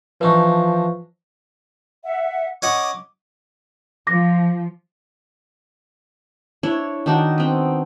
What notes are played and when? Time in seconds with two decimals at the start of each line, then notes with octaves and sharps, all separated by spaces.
0.21 E3 F3 D4 D#4 B4 C#6
2.04 E5 F#5
2.62 C#4 D#5 F#5 D6
4.07 F3 D6 A#6
6.63 D4 E4 C#5
7.06 D#3 D4 F#4
7.38 B3 C4